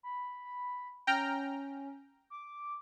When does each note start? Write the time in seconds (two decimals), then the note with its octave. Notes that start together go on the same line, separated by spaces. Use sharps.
0.03 B5
0.44 B5
1.07 C#4 G5 A#5 F6
2.30 D6